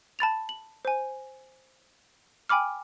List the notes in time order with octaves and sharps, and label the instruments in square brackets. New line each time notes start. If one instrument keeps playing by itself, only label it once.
[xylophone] A5 B5 A6 F7
F#7
C5 G#5
G5 G#5 B5 D6 F6